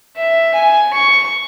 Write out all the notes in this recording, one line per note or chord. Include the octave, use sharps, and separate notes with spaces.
E5
G#5
C#6